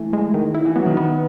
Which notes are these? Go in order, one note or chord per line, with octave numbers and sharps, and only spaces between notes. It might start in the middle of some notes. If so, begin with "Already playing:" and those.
Already playing: E3 A3
G#3
D#3
E4
E3
F#3 B3
D#3
B3